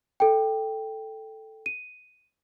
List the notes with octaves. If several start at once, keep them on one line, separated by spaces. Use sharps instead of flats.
A4 G5
D#7